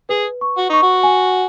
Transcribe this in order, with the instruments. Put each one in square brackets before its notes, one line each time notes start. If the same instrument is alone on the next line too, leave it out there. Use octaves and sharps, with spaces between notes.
[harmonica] G#4 [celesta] B4
[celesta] C#6
[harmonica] F#4
[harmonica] D#4 [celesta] C#6
[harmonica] F#4
[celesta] G#5